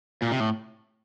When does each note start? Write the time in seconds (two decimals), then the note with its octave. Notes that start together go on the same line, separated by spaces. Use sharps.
0.22 A#2
0.32 C3
0.40 A2